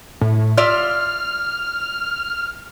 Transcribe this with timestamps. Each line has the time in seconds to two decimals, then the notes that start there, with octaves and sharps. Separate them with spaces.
0.21 A2
0.57 F4 D5 E5 F6